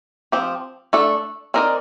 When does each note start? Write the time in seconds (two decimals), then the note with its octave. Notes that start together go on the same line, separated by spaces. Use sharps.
0.32 F3 C4 G4
0.93 A3 D4 A4
1.54 C4 D#4 A#4 D5